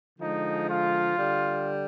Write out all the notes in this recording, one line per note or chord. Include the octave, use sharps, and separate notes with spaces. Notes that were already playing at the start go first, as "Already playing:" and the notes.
D3 F3 G#3 D#4
F4
D3 G3